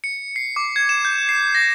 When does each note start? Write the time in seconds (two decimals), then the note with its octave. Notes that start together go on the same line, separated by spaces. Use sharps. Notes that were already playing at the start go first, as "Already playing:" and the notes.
0.04 C#7
0.36 C7
0.56 D6
0.76 G#6
0.89 E7
1.05 G6
1.29 C7
1.55 A#6